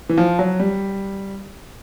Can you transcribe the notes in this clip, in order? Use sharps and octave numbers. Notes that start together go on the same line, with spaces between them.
E3
F3
F#3
G3